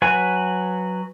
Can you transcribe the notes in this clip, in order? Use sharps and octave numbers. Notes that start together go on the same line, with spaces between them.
F#3 F#4 B4 G#5